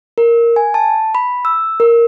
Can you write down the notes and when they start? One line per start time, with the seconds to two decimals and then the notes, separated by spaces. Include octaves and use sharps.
0.18 A#4
0.56 G#5
0.74 A5
1.15 B5
1.45 E6
1.80 A#4